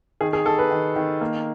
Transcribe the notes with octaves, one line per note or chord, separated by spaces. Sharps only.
D#3 G#4
G#4
D#3 A4
B4
D#3
D#3
A#3